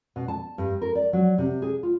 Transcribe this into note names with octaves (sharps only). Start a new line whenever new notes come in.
B2
A5
G2
A#4
D5
F#3
C3
G#4
F4